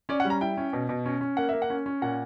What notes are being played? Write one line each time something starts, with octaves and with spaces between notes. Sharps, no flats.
C#4 D5
F#5
G3
A#5
E4 G5
C#4
B2
B2
C#4
C#4
A#3 F#5
A#3 E5
F#5
C#4
C#4
A#2 F#5